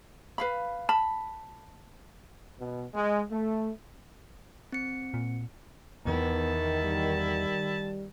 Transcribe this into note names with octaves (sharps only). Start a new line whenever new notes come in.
B4 F5 B5
A5 B5
B2
G#3
A3
C4 C#7
A#2
E2 D#3 B3 E4 A5
G3